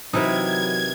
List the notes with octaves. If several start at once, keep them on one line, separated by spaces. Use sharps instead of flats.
C3 E3 F#3 D#4 E4 A#4 E5 G#6